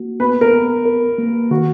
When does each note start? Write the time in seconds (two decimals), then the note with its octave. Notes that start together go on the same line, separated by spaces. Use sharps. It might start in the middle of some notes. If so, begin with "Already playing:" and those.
Already playing: A#3 F#4
0.20 B3 B4
0.41 A#4
0.53 B3
0.85 A#4
1.18 A#3
1.51 D#3 F#4